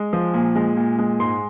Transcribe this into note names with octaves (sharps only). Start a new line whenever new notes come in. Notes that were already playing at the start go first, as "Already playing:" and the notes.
Already playing: G#3
F3
A#2
G#3
A#2
G#3
G#2 C6